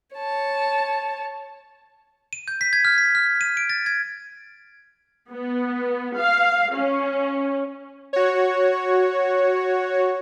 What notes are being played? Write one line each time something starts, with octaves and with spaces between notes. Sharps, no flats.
C#5 A5
D#7
G6
B6
G#6
F6
B6
F6
D#7
D7
A6
G#6
B3
F5
C#4
F#4 C#5